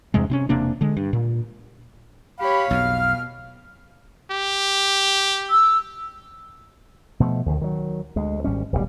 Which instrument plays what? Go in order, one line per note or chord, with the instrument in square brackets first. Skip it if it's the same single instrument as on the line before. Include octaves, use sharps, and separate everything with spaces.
[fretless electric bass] E2 G2 C3 G#3
C3 C4 C#4
E1 C3 A#3 D4
D3 G#3
G2
A#2
[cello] G4 C#5 [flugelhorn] F5 [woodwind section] B5
[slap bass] B1 F2 [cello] B2 [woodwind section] F6
[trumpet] G4
[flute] E6
[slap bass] B2 F3 G#3 A3
D2 D#3
D#3 F#3
D2 G#3
G#1 G3 C#4
D1 B1 G2 G3